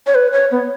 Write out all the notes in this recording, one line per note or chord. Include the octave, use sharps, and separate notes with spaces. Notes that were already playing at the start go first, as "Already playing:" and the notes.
C#5
B4
C#5
B3